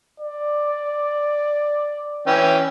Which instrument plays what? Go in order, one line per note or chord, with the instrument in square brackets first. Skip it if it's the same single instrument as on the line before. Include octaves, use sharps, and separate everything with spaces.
[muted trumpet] D5
[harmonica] E3 C#4 G5